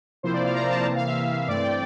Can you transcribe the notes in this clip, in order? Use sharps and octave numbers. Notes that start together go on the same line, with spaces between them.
C3 F3 A#3 E4 C5
D5
F5
A#5
A5
C3 E3 A#3
F5
E5
G2 E3 A3 C4 D5
G5